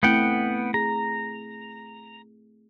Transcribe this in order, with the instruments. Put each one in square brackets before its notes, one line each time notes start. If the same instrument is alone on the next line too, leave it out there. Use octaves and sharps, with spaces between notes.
[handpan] A3 C4 E4 [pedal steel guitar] B3 F#5 G5
[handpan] G#4 [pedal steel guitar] A#5